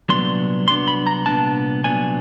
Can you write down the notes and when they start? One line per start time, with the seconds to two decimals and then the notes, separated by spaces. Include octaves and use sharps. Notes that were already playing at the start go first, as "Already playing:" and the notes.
0.09 C2 A#2 F#3 B3 D4 C6
0.67 C2 A#2 F#3 B3 D4 C6
0.88 B5
1.07 A#5
1.26 C2 A#2 F#3 B3 D4 A5
1.84 C2 A#2 F#3 B3 D4 G#5